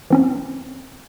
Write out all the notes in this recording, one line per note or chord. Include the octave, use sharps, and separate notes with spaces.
E3 C4 C#4